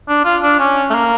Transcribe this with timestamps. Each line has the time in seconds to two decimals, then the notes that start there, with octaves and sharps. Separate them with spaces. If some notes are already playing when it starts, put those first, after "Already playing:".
0.09 D4
0.25 F4
0.42 D4
0.59 C#4
0.90 A3
0.94 A#3